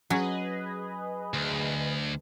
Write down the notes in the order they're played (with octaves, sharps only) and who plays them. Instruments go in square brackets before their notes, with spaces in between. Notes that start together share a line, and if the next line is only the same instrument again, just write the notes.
[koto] F#3 C#4 [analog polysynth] G#4 B4 D#5
[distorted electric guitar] D2